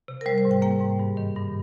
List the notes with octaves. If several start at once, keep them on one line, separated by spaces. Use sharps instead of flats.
C3
A#4
G3 C5
C5
G#2
G5
A#3 G5
G#2
G2
D#3
G2